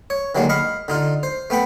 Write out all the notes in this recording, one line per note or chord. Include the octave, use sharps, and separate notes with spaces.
C#5
D3 D#3 F#3 G#3 A#3
D#5 F5 B5 C#6
D3 D#4 F4
C5
A3 B3 G5 B5